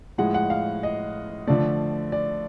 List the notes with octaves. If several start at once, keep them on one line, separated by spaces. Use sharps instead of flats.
A2 F3 G#3 F#5
F#5
F5
D#5
D3 F3 A3 D5
D5